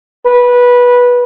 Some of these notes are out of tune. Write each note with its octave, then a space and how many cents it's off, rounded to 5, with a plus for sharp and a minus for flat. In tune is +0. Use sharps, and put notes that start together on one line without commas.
B4 -15